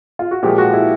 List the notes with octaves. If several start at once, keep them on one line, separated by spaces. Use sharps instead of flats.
F4
F#4
A#2 F3 G#3 G4
F#4
E4